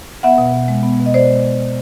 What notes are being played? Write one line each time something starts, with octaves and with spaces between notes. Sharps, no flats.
B3 E5 F#5
B2
B2
G#3
B3
B2
D#5
B2 C5 D5
G#3